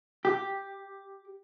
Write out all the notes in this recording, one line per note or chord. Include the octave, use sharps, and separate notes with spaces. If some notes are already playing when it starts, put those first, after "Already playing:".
G4